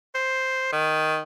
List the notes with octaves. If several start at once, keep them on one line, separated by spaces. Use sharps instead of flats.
C5
D#3